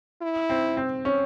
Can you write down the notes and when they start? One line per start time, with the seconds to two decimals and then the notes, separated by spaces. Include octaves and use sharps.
0.22 E4
0.50 C4
0.77 C4
1.05 C#4